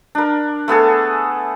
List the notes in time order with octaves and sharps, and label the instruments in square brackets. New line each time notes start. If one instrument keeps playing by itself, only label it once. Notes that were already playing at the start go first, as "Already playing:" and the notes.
[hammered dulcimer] D4 A#4
A3 B3 G#4 A4